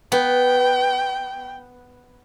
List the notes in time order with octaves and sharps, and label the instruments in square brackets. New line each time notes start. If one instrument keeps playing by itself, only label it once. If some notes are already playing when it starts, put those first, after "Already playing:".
[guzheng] B3 [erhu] G5